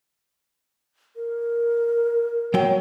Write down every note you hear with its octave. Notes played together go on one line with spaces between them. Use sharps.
A#4
F#3 G5